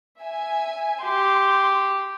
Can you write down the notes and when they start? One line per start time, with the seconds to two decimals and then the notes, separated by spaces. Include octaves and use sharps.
0.21 E5 G#5
1.03 G4 C6